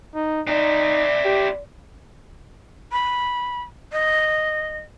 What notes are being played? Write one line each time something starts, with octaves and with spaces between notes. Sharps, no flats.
D#4
C4 D#4 E4 D5
G4
B5
D#5